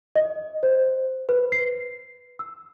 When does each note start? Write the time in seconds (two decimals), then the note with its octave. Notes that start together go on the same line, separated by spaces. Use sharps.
0.16 D#5
0.63 C5
1.29 B4
1.52 C7
2.39 E6